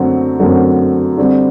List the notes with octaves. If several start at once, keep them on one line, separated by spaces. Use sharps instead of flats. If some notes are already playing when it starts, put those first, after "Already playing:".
Already playing: F#2 D3 F#3 A3 C4
F#2 D3 F#3 A3 C4
D3 G3 C4